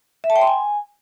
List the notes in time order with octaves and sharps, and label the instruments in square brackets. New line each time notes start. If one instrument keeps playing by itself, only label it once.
[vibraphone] E5
A5
G5
C6
G#5